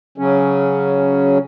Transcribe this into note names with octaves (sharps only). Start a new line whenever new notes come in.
C#3 F#3 C#4